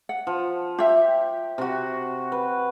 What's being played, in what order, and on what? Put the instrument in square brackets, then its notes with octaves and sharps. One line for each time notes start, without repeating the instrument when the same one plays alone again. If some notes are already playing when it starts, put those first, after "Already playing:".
[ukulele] F#5
[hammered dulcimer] F3
[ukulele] F4 E5 [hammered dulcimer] G4
[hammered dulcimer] C3 F#4
B4